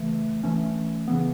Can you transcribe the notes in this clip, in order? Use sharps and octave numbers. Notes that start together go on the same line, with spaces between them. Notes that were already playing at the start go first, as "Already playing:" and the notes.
Already playing: C#3 E3 A3
E3 A3 C#4
C#3 E3 B3